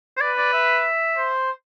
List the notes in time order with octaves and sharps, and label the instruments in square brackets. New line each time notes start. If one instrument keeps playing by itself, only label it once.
[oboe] C5
[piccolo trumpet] B4 [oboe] D5
[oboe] D5
E5
[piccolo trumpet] C5